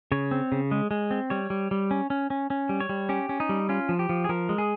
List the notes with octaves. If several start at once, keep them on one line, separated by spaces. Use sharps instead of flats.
C#3 C#5
C4
C#3
G#3
G#3
C4
G3 C#5
G3
G3
C#4
C#4
C#4
C#4
G3
C#5
G3
C#4 G4
C#4
D#4
G3
C#4 F4
F3
G4
F3
G#4
F3 A#4
G#3
G#4